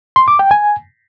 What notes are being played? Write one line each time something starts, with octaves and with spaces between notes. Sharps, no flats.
C6
D6
G5
G#5